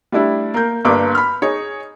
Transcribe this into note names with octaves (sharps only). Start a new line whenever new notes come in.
G3 A3 D4 E4
A#3 A#4 G6
G1 G2 A#3 B4 D6
B5 F6
D#4 G#4 C#5